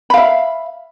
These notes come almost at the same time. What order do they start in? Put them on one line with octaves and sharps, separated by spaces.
B5 F5 E5